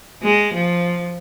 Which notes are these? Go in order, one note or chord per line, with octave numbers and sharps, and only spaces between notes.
G#3
F3